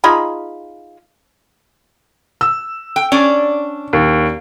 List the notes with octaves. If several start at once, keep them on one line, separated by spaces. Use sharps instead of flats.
D#4 F4 G#4 B5
E6
G5
C#4 D4 D5
D#2